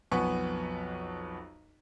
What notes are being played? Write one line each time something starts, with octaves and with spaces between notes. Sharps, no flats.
B1 F2 B3 B4 G#5 C#6